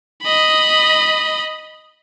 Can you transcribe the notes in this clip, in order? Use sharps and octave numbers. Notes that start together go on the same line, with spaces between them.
D#5 B5